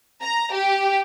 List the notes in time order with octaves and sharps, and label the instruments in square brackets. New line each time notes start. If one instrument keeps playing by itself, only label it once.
[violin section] A#5
G4